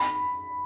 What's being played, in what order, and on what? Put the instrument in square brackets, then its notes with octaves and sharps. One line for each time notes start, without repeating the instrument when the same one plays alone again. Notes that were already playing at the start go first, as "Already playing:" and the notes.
Already playing: [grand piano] B5